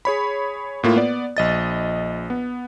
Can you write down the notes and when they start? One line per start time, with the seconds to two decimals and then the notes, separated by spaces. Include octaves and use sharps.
0.05 G#4 C#5 B5
0.83 A2 A#3 F4
0.96 B3 D5
1.37 A#1 D#5 A6
2.30 B3